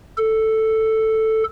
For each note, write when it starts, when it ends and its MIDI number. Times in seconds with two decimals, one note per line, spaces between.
0.18 1.44 69